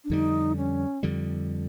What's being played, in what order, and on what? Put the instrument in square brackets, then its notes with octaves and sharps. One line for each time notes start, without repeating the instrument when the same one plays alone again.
[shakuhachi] D4
[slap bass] F2 D3 G3 [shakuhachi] D#4
[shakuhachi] C#4
[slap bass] F2 D3 G3